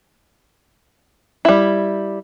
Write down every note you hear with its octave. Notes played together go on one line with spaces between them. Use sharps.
G3 E4